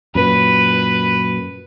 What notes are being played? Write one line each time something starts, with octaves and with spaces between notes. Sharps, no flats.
F#2 A#2 B4